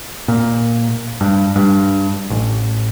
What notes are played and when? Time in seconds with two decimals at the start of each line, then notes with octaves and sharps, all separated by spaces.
0.28 A#2
1.21 G2
1.56 G2
2.30 A1